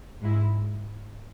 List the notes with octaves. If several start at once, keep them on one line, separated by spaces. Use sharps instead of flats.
G#2 G#3 E4